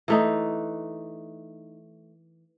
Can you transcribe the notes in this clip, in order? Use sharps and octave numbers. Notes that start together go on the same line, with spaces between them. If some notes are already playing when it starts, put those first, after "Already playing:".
E3 A3 D#4